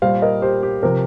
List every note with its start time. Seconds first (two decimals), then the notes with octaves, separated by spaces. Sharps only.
0.02 A#2 G3 C5 F5
0.22 A#4 D#5
0.42 G4 C5
0.63 G4
0.83 C3 F3 A#4